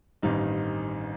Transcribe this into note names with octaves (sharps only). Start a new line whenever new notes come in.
A1 G2 D#3 G3 C4 D#4 D#5